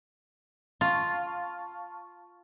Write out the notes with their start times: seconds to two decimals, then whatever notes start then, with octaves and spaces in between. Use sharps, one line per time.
0.81 F4 A5 C#6